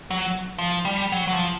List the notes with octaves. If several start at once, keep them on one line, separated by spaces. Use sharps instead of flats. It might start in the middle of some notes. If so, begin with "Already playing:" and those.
F#3
F3
G3
F#3
F#3
F3